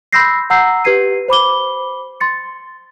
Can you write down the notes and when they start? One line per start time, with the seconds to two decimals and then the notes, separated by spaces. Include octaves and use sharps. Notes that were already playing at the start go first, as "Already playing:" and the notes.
0.13 B5 C6 E6 G6 A#6 C7
0.50 F#5 A#5 E6 G6 C7
0.84 G4 B4 G#6 C7 D#7
1.28 C5 B5 D6 G7
2.20 C6 A6 C#7